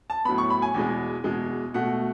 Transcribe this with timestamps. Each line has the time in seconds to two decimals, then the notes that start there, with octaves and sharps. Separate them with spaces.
0.10 A5
0.25 A2 F#3 B3 B5
0.38 C#6
0.50 B5
0.62 G#5
0.74 E2 B2 G#3
1.24 E2 B2 G#3
1.74 B2 A3 F#5